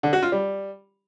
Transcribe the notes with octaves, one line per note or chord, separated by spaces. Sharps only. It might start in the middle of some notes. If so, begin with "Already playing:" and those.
D3
F#4
F4
G3